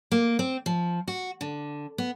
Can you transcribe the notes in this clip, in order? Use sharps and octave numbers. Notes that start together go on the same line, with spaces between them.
A#3
C4
F3
F#4
D3
B3